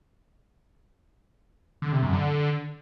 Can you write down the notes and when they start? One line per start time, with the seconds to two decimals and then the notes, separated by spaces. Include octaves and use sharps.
1.82 D3
1.92 C3
2.02 F#2
2.13 D3